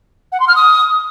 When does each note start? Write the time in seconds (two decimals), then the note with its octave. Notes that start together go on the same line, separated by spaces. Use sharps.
0.32 F#5
0.40 C6
0.48 F6
0.56 D#6